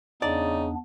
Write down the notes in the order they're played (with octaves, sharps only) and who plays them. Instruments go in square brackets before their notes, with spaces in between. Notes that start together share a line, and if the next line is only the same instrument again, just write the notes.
[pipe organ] E2 B3 D4 [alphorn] C#3 [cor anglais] D#4 [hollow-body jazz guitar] D5